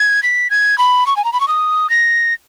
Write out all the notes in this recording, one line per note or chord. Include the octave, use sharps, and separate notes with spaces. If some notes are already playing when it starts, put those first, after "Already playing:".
Already playing: G#6
B6
G#6
B5
C#6
G#5
A#5
B5
C#6
D#6
A#6